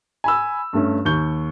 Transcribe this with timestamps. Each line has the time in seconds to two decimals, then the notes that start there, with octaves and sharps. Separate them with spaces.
0.24 G#5 B5 E6
0.73 G2 A3 C#4
1.05 D#2 C#6 G6 G7